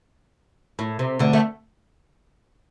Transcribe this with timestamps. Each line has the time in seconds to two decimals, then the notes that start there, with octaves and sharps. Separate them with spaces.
0.79 A2
0.99 C3
1.19 D2 D3
1.33 A3